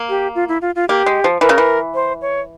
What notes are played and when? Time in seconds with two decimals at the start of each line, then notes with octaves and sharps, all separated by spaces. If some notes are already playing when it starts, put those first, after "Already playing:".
Already playing: A#3
0.09 G4
0.35 F4
0.48 E4
0.62 F4
0.76 F4
0.89 A#3 G4
1.06 G#3
1.24 F3
1.41 E3 A#4
1.49 C#3
1.58 E3
1.95 C5
2.22 C#5